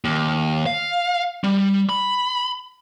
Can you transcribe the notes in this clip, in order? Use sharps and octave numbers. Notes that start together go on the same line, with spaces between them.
D#2
F5
G3
B5